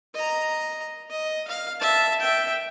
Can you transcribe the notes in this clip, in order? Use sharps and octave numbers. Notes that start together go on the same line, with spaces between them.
D#5 A#5
D#5
F5
E5 A5
E5 G5